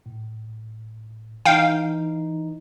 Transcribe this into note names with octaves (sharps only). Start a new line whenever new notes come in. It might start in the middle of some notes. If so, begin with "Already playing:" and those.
A2
E3 D#4 F5 G5